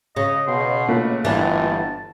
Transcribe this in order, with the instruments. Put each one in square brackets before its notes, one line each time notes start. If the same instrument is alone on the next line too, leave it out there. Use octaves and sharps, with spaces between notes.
[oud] C#3 [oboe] D#5
[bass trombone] B2 [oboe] C6
[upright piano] A#2 A3 [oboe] B4
[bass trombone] G1 [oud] E3 D4 [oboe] A5